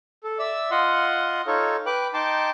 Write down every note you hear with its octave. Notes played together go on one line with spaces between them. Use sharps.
A4
D5 E5 E6
F4 D#5 F#5 C6
D#4 F4 A4 C#5
B4 G5 D6 F#6
D#4 G5 A5 C6 D6